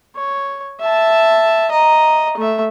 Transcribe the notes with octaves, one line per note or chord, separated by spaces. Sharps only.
C#5
E5 A5
D#5 A#5
A3 E5